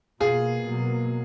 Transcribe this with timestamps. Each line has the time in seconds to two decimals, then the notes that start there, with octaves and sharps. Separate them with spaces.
0.20 B2 A#3 F4 G#4
0.65 B2 F#3 A#3